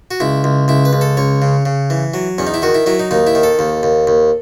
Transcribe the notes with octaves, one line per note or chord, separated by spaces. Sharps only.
F#4
C#2 E4
C#2
C#2 E4
B4
C#2
A4
C#2 C#5
C#3
C#3
E3
F#3
E2 C#4
D#4
E4
D#3 F#4
E4
F#3 E4
D#4
D#2 D#4
E4
D#3
A4
D#2
D#2
D#2